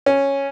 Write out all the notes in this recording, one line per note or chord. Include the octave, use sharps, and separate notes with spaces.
C#4